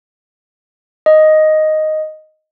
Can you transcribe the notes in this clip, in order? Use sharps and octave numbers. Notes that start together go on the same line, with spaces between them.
D#5